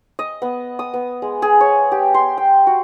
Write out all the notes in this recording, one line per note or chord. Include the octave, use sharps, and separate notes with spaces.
D#5
B3
D#6
B3
G#3
G#4
C#5
G4
C6
G5
F#4